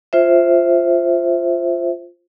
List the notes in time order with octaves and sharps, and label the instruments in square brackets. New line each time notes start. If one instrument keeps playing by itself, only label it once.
[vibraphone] F4 C5 E5